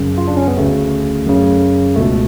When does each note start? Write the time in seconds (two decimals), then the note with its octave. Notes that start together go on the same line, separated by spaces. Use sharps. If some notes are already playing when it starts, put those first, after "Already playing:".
Already playing: F#2 C#3
0.18 F4
0.27 D4
0.37 C#4
0.48 B3
0.57 D2 C#3 A3
1.27 F#2 C#3
1.96 C#2 B2 A3